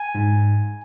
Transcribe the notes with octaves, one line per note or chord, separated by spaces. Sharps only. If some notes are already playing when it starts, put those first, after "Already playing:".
Already playing: G#5
G#2